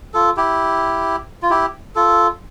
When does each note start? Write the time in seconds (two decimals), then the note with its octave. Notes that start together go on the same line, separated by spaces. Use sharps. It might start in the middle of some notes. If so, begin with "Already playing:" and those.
0.14 F4 A4
0.37 E4 G4
1.42 F4
1.50 E4 G4
1.95 F4 A4